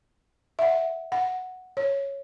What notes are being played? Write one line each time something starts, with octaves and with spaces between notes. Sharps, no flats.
E5 F#5
F#5
C#5